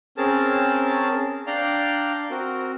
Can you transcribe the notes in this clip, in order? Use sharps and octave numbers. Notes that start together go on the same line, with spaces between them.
C4 C#4 G#4 A#4 A5
D4 D5 F5 G5 A#5
C4 F#4 A#4